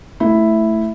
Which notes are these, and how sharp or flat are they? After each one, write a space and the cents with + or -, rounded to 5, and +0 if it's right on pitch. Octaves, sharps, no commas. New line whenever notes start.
A3 +0 E4 +0